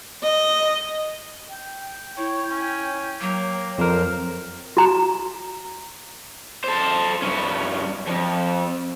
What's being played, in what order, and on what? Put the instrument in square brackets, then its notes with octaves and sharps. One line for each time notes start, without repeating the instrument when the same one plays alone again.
[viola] D#5
[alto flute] G5
[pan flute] E4 [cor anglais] C#5
[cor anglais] C#4
[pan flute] F#3 [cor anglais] A#3
[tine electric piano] F2 A#4 [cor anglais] C5
[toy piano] F#4 A#5
[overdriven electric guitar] A4 C5
G2 C#4
F2